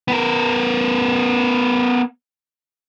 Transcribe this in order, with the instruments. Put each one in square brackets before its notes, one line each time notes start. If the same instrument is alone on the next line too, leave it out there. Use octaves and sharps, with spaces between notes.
[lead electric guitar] B3 A#4